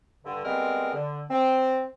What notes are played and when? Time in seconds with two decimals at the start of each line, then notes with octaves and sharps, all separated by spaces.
0.24 G2 D3
0.44 G3 G#3 B3 C4 G#4 A#4
0.94 D3
1.30 C4